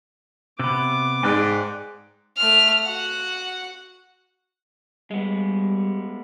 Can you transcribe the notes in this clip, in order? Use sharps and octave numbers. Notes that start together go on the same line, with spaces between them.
C3 B3 D6
G#2 B4 D5 G5
A3 F6
F#4 F#5
G3 G#3 B3